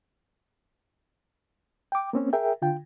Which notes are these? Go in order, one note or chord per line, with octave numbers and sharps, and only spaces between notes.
G5 D6
A#3 C4 C#4
G#4 A#4 E5 G5
D3 F4 G5